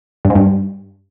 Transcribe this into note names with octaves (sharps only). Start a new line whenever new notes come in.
G2
G#2
G2